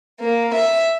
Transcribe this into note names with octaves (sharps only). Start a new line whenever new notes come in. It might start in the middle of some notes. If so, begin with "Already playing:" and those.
A#3
E5